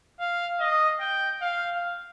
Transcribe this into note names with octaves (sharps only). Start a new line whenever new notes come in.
F5
D#5
G5
F5